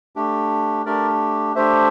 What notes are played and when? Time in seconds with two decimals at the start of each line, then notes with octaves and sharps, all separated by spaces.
0.16 A3 D4 G4
0.86 A3 D4 G4 A#4 D5
1.55 A3 D4 G4 C5 E5